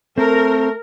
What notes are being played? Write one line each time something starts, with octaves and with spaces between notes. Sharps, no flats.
A3 C4 A#4